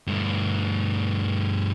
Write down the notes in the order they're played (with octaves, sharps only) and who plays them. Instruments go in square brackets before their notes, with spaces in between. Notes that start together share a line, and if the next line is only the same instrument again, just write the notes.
[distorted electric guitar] G2 A3